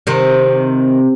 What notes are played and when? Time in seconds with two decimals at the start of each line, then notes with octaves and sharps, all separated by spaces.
0.07 C3 D#3